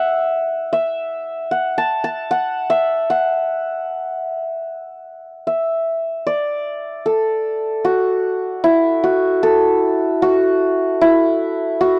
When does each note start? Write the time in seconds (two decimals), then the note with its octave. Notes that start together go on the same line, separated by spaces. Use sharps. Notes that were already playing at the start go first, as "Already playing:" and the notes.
Already playing: E5 F#5
0.73 E5
1.51 F#5
1.78 A5
2.04 A5
2.31 F#5
2.70 E5
3.10 F#5
5.47 E5
6.27 D5
7.06 A4
7.85 F#4
8.64 E4
9.04 F#4
9.43 A4
10.22 F#4
11.01 E4
11.81 F#4